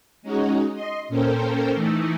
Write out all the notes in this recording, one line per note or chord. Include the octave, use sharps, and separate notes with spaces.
G#3 C#4 D#4 F#4 G#4
D#5 C6
A#2 C#4 A4 A#4 C5 G5
E3 A3 D#4 E4